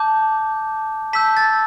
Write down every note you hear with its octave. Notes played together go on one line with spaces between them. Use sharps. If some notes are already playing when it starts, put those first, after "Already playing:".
Already playing: A5 D6 G6
A5 E6 G6 B6
A6